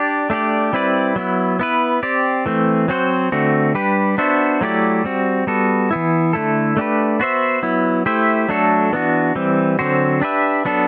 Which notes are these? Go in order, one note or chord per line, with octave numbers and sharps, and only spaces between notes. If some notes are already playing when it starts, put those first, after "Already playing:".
Already playing: D4 G4 D5
A3 D4 G4 D5
G3 C4 E4 B4 D5
F#3 B3 E4
B3 E4 B4
C4 G4 D5
E3 A3 C4
F#3 C4 F#4 C5
D3 A3 C4 F#4
G3 D4 G4 B4
B3 D4 F#4 C5 E5
F#3 A3 E4 G4 D5
G3 C4 F#4
G3 B3 F#4 A4
E3 B3 E4
D3 A3 E4 A4
A3 D4 G4 B4
B3 F#4 C5 E5
F#3 B3 E4
A3 E4 G4 C5 E5
F#3 A3 D4 F#4 A4
E3 B3 D4 F#4
E3 G3 C4
D3 F#3 C4 F#4 C5
D4 G4 B4 E5
F#3 B3 D4 A4